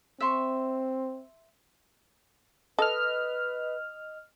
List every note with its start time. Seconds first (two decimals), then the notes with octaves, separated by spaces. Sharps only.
0.20 C4 E5 C6 C#6
2.79 A4 B4 D#5 F6